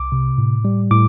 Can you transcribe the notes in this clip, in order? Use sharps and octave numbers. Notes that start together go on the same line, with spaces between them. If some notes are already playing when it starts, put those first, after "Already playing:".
Already playing: C2 D6
C3
A2
G3
A2 D6